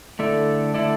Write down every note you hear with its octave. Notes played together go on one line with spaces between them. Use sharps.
D3 A3 E4 A4 D5
D3 A3 E4 A4 D5